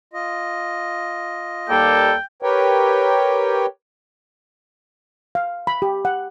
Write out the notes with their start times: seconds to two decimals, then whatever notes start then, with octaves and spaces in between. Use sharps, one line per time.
0.13 F4 D#5
1.70 D#2 G3 A#3 A4 G5
2.42 G4 A#4 B4 C#5 G5
5.35 F5
5.67 B5
5.82 G4
6.05 F#5